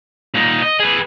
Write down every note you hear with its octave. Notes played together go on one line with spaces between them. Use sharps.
A#2 D#4
D#5
G#4 B4